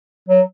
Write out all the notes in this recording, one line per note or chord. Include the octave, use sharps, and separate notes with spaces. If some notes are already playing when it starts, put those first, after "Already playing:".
F#3